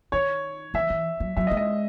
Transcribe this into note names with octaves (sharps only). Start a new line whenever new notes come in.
D#3 C#5
E3 E5
E3
F#3
F#3 E5
D#5
G#3
D#5